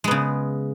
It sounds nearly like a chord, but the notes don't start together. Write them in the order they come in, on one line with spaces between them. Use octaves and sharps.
G#3 B3 C#3